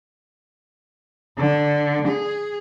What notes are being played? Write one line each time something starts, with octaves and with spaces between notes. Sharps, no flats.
D3
G#4